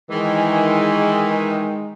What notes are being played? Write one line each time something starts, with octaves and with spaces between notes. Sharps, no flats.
D#3 E3 G#3